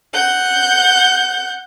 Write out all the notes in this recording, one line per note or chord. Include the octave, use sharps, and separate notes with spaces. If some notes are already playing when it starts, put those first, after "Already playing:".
F#5 G6